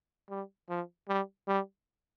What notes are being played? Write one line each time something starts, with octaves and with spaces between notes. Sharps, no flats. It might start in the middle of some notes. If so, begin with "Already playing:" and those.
G3
F3
G3
G3